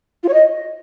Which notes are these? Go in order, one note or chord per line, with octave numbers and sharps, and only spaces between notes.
F4
C#5
D#5